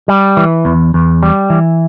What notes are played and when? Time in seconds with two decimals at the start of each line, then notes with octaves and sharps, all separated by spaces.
0.08 G3
0.37 E3
0.65 E2
0.94 E2
1.23 G3
1.50 E3